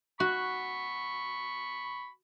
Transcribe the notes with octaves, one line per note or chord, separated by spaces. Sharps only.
F#4 B5 C#6